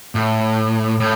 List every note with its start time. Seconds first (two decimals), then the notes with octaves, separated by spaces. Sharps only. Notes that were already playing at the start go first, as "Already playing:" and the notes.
0.15 A2
1.00 A2